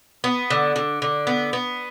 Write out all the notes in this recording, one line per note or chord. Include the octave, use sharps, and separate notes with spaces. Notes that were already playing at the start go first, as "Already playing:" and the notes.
B3
D3
D3
D3
B3
B3